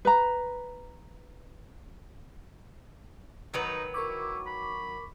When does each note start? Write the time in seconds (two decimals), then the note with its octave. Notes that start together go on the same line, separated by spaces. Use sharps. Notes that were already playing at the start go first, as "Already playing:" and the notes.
0.05 B4 A#5
3.54 D#3 F#3 D#4 B4
3.94 E4 A#4 C#6 D6
4.47 B5